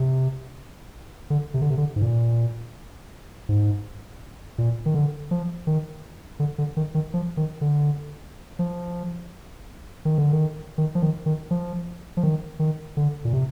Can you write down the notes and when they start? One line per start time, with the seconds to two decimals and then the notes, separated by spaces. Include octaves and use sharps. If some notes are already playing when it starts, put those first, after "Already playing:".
Already playing: C3
1.30 D3
1.54 C3
1.62 D3
1.70 C3
1.78 D3
1.96 G#2
2.02 A#2
3.49 G#2
4.58 A#2
4.86 D#3
4.94 D3
5.31 F3
5.67 D#3
6.40 D3
6.58 D3
6.77 D#3
6.95 D#3
7.14 F3
7.37 D#3
7.61 D3
8.59 F3
10.05 D#3
10.18 D3
10.32 D#3
10.78 D#3
10.95 F3
11.02 D#3
11.26 D#3
11.51 F3
12.17 F3
12.23 D#3
12.59 D#3
12.97 D3
13.25 A#2
13.33 C3